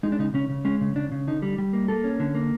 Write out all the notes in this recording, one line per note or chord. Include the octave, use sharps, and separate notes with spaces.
G#3 D#4
D4
C#3 D#4
C#3 C#4
C#3
G#3 C#4
C#3
C#3 D4
C#3
D3 D#4
G3
G3
A#3
A#3 A4
C#4
D3
A#3